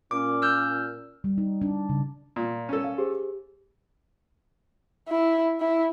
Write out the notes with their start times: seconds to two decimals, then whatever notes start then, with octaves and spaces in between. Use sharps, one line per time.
0.11 A#2 C#4 D6
0.42 E6 F6 G6
1.24 G3
1.38 D#4
1.62 D4
1.89 C#3
2.36 A#2
2.69 C#4 A4
2.84 F5
2.98 G4 G#4 C5
5.09 E4
5.60 E4